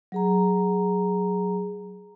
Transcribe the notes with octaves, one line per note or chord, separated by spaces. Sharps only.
F#3 G#4 A#5